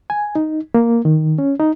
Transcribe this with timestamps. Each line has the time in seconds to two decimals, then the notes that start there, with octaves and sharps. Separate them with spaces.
0.10 G#5
0.35 D#4
0.74 A#3
1.05 D#3
1.38 C#4
1.60 D#4